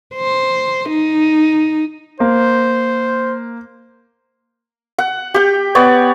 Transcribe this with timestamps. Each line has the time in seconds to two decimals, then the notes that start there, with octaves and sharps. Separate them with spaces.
0.15 C5
0.89 D#4
2.20 A#3 C5
4.98 F#5
5.34 G4 G5
5.75 B3 C#5 D5